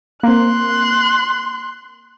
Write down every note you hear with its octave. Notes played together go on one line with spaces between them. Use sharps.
A#3 C4 C6 F#6